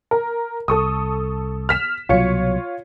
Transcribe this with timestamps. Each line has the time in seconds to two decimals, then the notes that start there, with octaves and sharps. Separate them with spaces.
0.11 A#4
0.68 C2 A4 C#6 D#6
1.69 F6 B6 E7
2.09 C2 B2 F#3 F4 C#5 C#7